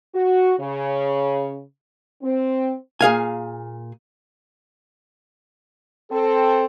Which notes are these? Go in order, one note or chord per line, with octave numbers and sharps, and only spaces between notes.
F#4
C#3
C4
A#2 G#4 F5 G#5
C4 A4